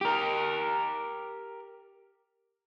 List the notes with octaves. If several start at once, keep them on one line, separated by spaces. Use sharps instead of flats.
G4 A#4